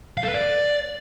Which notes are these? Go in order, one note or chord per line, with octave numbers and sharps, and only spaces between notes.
F5
A4
B4
D5